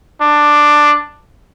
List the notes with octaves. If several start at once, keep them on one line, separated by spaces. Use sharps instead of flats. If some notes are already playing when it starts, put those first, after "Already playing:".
D4